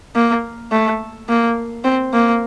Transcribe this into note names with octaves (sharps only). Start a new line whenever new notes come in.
A#3
A3
A#3
C4
A#3